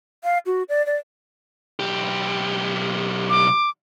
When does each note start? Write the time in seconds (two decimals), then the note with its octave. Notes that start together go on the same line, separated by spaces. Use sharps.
0.24 F5
0.46 F#4
0.69 D5
0.86 D5
1.80 B1 G4
3.30 D6